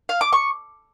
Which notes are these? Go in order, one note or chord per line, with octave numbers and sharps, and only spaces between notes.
F5
D6
C#6